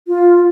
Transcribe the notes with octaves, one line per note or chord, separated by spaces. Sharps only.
F4